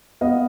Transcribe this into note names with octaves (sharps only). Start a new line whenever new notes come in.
B3 D#5 F5